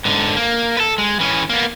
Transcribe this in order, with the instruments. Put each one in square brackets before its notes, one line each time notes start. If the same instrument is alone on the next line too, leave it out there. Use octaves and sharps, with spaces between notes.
[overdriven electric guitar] G#2 D3
A#3
A4 B4
G#3
E3 C#4
A#3 B3